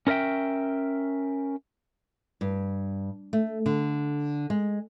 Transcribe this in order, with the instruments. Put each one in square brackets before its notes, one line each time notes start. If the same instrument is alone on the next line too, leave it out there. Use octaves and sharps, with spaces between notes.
[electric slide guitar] C#4 A#4 C#5 E5 G5
[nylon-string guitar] G2
A3
D3
G#3